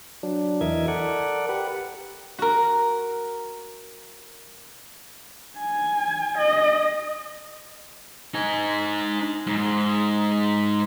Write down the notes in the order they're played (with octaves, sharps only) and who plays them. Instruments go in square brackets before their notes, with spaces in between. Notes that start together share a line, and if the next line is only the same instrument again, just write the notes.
[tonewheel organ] F#3 D4
E2 E3 A#4 D#5 E5 G#6
A4 A#4 D5 F#5
G4 B4 F#5
[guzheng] F#4 A#4
[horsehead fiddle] G#5
D#5
[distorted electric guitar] D#4 G#5
G#2